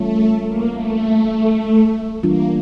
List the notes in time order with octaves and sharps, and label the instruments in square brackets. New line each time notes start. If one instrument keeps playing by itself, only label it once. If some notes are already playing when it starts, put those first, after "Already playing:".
Already playing: [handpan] E3 G3 C#4 F4 C#5 [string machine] A3
[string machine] A#3
A3
[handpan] E3 G3 D4 F4 [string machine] A#3